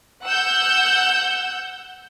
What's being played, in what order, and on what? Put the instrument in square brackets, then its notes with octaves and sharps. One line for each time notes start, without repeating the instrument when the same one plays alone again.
[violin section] F#5 E6 G6